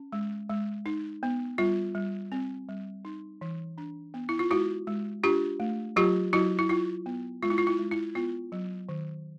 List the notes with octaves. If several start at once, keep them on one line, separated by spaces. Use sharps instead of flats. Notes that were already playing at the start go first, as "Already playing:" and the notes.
Already playing: C#4
G#3
G#3
D#4
B3
G3 F4
G3
C4
G3
D#4
E3
D4
B3
E4
F4
G#3 E4 F#4
G#3
D4 F4 G4
A3
F#3 F4 G4
F#3 E4 F#4
E4
E4 F4
B3
G#3 F4
E4
F4
E4
G#3
E4
B3 F4
F#3
D#3